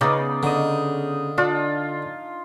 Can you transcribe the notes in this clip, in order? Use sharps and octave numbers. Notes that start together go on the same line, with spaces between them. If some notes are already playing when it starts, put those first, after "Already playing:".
C#3 B3 D#4 D5 F5
D3 D#4 D#5
D4 F4